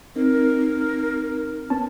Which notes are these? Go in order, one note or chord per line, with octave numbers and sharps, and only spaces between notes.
C4 D#4 A#4
B3 C#4 A5